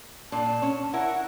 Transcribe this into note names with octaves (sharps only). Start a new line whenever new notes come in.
A#2 A#3 D4 A5
C#4
E4 A#4 F#5